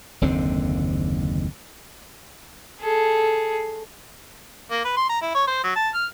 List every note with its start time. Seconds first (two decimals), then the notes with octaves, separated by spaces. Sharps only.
0.21 F#1 D#2 D3 C4
2.81 G#4 A4
4.71 A#3
4.85 B4
4.97 C6
5.09 A#5
5.22 E4
5.35 C#5
5.47 C5
5.64 F#3
5.75 A5
5.94 F6